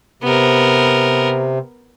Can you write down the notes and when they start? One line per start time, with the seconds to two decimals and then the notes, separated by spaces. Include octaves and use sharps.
0.23 C3 B3 A#4